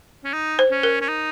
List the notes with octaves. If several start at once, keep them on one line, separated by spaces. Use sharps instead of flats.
C#4
D#4
C5
C#4
A#4
C#4
D#4